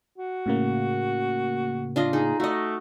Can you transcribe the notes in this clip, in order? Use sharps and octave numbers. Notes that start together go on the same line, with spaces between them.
F#4
A2 C#3 A#3
D4 F4 D#5
D#4 G#4
A3 F#4 D#5